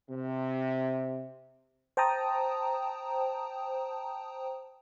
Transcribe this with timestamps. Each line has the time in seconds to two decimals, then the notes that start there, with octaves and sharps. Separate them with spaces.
0.10 C3
1.97 C5 G5 A5 A#5 D#6